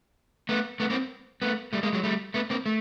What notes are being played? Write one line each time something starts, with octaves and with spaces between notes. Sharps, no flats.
A3 B3
A3 B3
A#3 C4
A3 B3
G3 A3
G#3 A#3
F#3 G#3
G3 A3
A3 B3
A#3 C4
A3